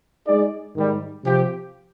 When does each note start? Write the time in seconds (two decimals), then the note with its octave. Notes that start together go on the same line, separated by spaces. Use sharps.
0.25 G#3 D#4 G#4 D5
0.74 G#2 D#3 G3
1.24 C3 F3 C4 G4